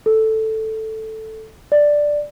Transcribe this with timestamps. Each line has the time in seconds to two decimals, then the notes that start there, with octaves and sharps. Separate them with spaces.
0.06 A4
1.72 D5